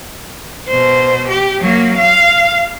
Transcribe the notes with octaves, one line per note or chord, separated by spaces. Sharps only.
B2 C5
G4
F#3 A#3
F5